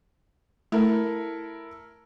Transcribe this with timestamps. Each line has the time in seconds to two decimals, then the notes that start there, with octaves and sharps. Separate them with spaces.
0.72 A3 E4 A4 A#4